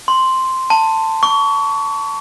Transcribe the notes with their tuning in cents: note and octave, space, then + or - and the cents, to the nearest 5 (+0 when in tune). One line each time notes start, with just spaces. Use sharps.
C6 +0
A5 +15
C#6 +30